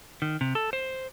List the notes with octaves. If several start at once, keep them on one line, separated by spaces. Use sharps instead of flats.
D#3
C3
A4
C5